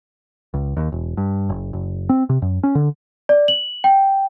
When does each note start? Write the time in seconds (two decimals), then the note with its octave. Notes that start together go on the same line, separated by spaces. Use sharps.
0.54 C#2
0.77 D#2
0.92 E1
1.17 G2
1.49 F#1
1.73 F#1
2.09 C4
2.29 C3
2.42 F#2
2.63 C#4
2.75 D3
3.29 D5
3.48 F#7
3.84 G5